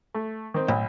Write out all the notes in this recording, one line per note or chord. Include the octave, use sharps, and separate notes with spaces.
A3
D#3 C4
B1 A2